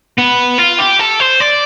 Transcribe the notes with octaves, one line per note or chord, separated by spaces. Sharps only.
B3
F4
G4
A4
C5
D5